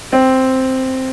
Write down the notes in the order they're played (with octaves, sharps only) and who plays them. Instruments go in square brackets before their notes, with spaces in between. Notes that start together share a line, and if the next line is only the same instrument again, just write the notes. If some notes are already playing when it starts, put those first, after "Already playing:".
[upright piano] C4